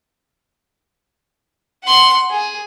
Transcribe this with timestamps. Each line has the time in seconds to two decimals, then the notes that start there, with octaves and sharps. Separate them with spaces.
1.84 F#5 C6
2.30 G#4